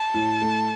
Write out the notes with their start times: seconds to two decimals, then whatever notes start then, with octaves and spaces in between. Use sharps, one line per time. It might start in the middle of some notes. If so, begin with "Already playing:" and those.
Already playing: A5
0.14 A2
0.42 A3